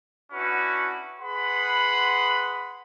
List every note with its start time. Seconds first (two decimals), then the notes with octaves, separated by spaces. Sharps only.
0.33 C#4 D4 E4 F#4 B4
1.19 G#4 B4 F#5 B5 C6